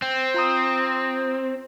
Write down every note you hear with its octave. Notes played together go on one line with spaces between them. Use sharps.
C4
F4 A#5 D#6